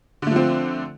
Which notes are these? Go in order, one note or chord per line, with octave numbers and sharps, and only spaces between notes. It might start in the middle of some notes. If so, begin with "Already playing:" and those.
D3 F3 A3 C4